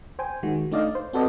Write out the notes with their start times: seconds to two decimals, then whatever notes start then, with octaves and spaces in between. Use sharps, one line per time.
0.19 C5 G5 G#5
0.43 D#3 G#3 F#4
0.72 A3 D4 D#4 D5 D#5 F5
0.95 C5
1.13 C4 F#4 A4 B4 D5 D#5